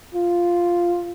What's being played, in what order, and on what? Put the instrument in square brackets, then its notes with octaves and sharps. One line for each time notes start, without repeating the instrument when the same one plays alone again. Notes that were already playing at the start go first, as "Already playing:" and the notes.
[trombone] F4